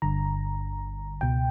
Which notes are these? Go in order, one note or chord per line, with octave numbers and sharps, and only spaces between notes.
G1 G2 D3 A#5
C#2 B2 G5